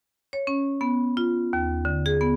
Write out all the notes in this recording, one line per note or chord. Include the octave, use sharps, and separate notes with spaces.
C#5
C#4
B3
F4
D#2
D3
G#4
B3